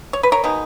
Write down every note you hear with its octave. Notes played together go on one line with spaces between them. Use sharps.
C#5
B4
A#4 C#5
B2 G#3 D#4